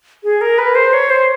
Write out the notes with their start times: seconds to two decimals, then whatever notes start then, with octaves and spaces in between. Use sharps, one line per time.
0.24 G#4
0.41 A#4
0.58 B4
0.75 C5
0.93 C#5
1.10 C5